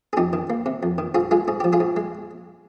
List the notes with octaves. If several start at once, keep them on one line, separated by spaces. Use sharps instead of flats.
G#4
F2 D#4 G4
D#3
A#3
C3
F2
D#3
G#2 F4 G#4
G#3 F4 G#4
G#2 G#4
F3 G4
F4 G#4
G#2
G#3